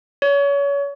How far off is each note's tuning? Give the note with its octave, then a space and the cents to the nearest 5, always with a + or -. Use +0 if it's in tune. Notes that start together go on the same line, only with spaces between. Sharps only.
C#5 +30